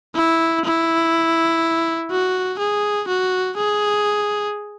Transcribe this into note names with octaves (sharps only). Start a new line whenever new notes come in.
E4
E4
F#4
G#4
F#4
G#4